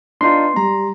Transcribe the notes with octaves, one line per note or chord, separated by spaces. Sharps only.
B3 D4 D#4 F4 C6
G3 A#5